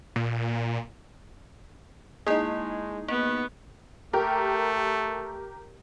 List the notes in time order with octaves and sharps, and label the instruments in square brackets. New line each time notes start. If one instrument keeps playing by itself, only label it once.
[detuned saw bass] A#2
[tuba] G#3 [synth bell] A#3 E4 [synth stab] D#4 G#4
[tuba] G#1 [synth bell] A#3 [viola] B3
[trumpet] A3 [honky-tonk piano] G4 A#4